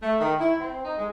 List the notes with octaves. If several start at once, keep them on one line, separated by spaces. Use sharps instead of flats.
A3
D#3
E4
C4
D#4
G#3